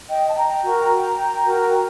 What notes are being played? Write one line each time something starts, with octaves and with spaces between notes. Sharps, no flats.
D#5 G5
A5
G5 A#5
F#4 A#4
F#4 A#4